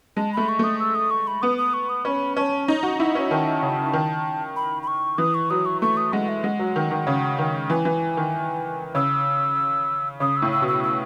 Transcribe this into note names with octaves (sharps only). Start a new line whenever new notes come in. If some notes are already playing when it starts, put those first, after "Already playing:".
G#3 A5
A3 B5
C#6
A3 D#6
E6
D#6
C#6
B5
B3 D#6
D#6
C#6
D#6
C#4 B5
C#4 A5
D#4 C#5
F#4 D#5
E4 E5
C#4 F#5
D#3 A5
C#3
D#3
B5
B5
C#6
E3 D#6
C#6
F#3 D#6
C#6
A3 C#6
D#6
G#3 F#5
E5
G#3 F#5
F#3
D#3
D#3
C#3
D#3
E3 G#5
E3
D#3
C#3 E6
C#3 D#6
E6
A2
E6
B2
E6
E6